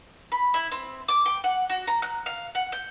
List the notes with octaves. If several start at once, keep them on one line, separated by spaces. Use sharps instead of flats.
B5
E4
C4
D6
G5
F#5
F#4
A#5
F#6
F5
F#5
G6